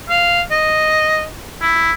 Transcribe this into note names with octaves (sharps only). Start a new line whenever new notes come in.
F5
D#5
E4